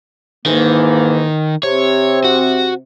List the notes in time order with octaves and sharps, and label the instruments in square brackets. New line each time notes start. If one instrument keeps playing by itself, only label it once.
[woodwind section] G#2 E3 A#3 [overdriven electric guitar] D#3
[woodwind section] C3 C4 [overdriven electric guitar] C#5
[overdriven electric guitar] F#4